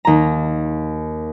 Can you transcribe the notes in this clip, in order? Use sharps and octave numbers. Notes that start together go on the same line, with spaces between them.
D#2 A#5